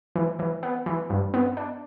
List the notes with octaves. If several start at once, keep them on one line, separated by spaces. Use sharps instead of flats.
E3
E3
B3
E3
G2
B3
D4